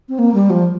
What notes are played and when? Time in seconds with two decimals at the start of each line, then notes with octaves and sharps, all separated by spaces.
0.09 C4
0.19 A#3
0.34 G3
0.50 F3